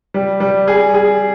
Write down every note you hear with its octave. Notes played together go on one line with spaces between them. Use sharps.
G3
G3
G#4
G#4